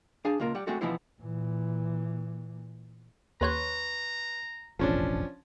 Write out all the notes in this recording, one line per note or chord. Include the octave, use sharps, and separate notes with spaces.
D4 G#4 F5 G#5 A5
C#2 A#3 F4 A#4
G3 F#5
G#3 A3 C4 F#4 A4
B2 E3 F3 B3 E4 C5
A#2 E3
D#2 B4 C#5 A#5 C6 C#6 F#6
E1 A1 F2 F3 C#4 D4